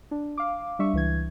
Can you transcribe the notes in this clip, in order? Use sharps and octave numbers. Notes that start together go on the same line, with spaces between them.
D4
F5 D6
G3 D4 E5 C#6
C#2 E3 G#6